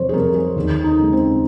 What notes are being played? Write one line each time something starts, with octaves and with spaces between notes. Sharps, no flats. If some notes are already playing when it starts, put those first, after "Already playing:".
Already playing: F2 C3 G3 C5 C#5
G#4
C3 G3 A#4
G#4
D#2
D#4
C#3 G#3
C4